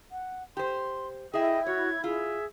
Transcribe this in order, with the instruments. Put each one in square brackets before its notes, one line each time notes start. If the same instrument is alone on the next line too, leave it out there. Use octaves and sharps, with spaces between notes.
[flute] F#5
[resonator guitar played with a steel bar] G4 C5 [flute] C6
[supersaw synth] E4 [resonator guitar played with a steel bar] G#4 E5 [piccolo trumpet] D#5 [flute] G5
[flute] F#4 [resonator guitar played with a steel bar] C#5 [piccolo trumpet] G#6
[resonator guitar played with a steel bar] F4 [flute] G#4 [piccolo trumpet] E5